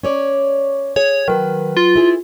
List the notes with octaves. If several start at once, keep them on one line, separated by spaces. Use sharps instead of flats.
C#4 C#5 D5
G#4 C#5
D#3 F#3 B4
F4
E4 G#4